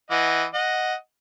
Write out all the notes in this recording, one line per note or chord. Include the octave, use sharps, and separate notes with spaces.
E3 D#5 F#5
D#5 F#5